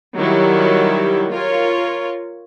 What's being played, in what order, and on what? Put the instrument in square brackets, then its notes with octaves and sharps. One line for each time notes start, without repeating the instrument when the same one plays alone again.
[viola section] D#3 F#3 G3 E4
F4 A#4 C#5